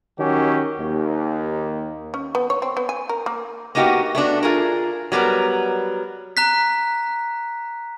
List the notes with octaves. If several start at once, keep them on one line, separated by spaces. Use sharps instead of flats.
D#3 F#3 C#4 G4
D#2
C#4
B3
C#5
C4
B3
G#5
A#4
A#3
A#3 B3 D#4 F#4 G4 F5
A3 B3 D4 F#4
F4 G#4 A#4
F#3 G3 B3 A#4
A#5 F#6 B6